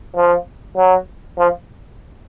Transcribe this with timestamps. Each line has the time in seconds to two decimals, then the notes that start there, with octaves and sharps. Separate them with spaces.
0.16 F3
0.77 F#3
1.38 F3